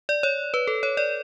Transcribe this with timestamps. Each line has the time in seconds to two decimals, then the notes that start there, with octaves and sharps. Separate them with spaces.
0.09 D5
0.23 C#5
0.54 B4
0.67 A4
0.83 C#5
0.97 D5